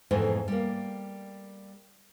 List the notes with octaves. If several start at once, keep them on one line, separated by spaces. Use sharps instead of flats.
F2 G#2 B2 E3 A3
G3 A#3